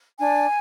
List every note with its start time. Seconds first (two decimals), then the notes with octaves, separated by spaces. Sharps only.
0.19 D4 G#5